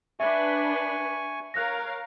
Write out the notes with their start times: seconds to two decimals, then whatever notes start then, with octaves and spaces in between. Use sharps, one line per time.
0.20 D4 B4 E5 G#5 C#6
1.54 A#4 C#5 F5 F#6 A#6